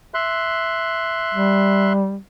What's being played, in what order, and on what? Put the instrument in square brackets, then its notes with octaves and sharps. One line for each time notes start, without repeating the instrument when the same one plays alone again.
[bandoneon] E5 C6 F#6
[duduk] G3